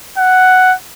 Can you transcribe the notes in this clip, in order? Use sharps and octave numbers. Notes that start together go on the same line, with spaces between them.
F#5